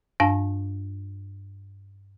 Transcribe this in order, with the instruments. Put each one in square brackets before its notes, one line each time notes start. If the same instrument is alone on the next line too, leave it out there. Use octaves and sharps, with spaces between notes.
[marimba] G2 D4 F5 A5